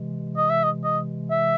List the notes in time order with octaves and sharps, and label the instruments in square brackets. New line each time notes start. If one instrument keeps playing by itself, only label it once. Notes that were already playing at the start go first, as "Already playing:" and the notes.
Already playing: [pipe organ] C3 E3 G#3
[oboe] D#5
E5
D#5
D#5
E5